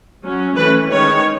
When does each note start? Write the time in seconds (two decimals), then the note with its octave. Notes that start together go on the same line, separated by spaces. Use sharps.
0.22 F#3 C#4
0.56 E3 A3 C#4 B4
0.91 D#3 G#3 C#4 C#5